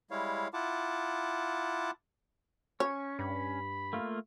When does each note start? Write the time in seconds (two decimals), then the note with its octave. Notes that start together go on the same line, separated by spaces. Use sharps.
0.11 G3 G#3 E4 C#5 F5
0.54 E4 F4 F#5 A5 D6
2.80 C#4 C#5 C#6
3.19 G2 B5
3.93 A3 A#3 F4